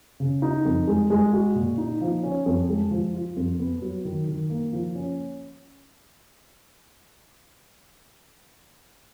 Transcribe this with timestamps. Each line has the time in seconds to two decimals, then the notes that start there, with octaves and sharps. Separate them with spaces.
0.20 C#3
0.42 D#4
0.65 F2
0.87 G#3
1.10 G#3
1.33 F#4
1.56 A#2
1.78 D#4
2.01 F3
2.23 C#4
2.46 F2
2.69 G#3
2.91 F3
3.14 F4
3.36 F2
3.59 B3
3.82 F#3
4.05 D#3
4.27 D#3
4.50 A#3
4.73 F3
4.95 C#4